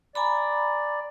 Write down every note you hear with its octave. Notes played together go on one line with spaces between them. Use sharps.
D5 G#5 A#5 B5